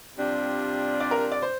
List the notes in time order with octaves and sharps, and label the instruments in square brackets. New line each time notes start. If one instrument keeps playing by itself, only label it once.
[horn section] C3 G3 D4 F4
[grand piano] D5
A#4
D5
C5